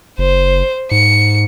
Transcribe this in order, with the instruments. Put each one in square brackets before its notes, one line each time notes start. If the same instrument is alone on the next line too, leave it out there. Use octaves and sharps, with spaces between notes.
[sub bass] F#1 [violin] C5
[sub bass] G#2 [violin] C#7